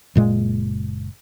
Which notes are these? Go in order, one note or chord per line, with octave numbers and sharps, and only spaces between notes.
F#1 A#2 G#3